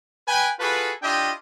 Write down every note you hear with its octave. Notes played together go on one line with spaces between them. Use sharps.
B4 G5 G#5
F4 F#4 G#4 A4 B4
D4 E4 F4 G4 D#5 G5